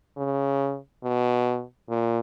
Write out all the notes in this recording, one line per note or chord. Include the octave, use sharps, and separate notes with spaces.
C#3
B2
A#2